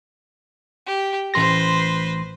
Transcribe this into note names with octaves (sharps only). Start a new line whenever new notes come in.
G4
A1 B4 C5 C6 A#6